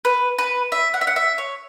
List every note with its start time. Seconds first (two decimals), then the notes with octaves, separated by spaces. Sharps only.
0.05 B4
0.38 B4
0.72 E5
0.94 F#5
1.01 E5
1.07 F#5
1.16 E5
1.38 C#5